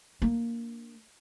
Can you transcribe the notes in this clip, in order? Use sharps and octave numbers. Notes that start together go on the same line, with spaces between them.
A#3 D4